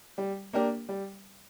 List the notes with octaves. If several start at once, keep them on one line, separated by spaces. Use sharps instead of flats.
G3
A#3 D4 G4 A#4
G3